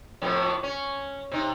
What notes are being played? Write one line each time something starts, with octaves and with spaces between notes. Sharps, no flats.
F2 A2 B3
C#4
C3 D#4